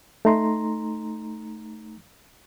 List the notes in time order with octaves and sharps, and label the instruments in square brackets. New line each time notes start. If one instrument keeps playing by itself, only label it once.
[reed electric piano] A3 D#4 A#5 C6